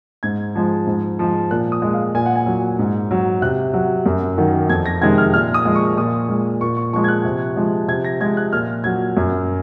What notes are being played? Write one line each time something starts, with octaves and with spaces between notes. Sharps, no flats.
G#2 G#6
F3 G#3
G#2
F3 G#3
A#2 F#6
D#6
G#3
F5
A#2 G#5
F#5
G#5
F#3
G#2
F#3
C3 F#6
F#3
F#2
D#3 F#3
F2 G#6
A#6
C3 D#3 G#3 G#6
F6
A#2 F6
D#6
F3 G#3
C#6
A#2 D#6
G#3
A#2 C#6
C#6
F3 G#3 C#6
G#6
F#6
C3
F3 G#3
C3 G#6
A#6
F3 G#3 G#6
F#6
A#2 F6
F#3 G#6
F#2